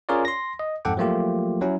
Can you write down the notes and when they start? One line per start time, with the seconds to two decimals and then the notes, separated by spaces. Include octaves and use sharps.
0.09 C#4 F4 G#4 A#4 C#5 D5
0.25 C6 A#6
0.59 D#5
0.85 F2 G#2 A4 F#5 G5 D6
0.97 F3 F#3 A3 A#3 F4 G4
1.61 F#3 C#4 E4